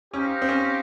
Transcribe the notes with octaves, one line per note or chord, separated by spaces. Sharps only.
C#4 D#4 G4 C5 F5
C4
C#4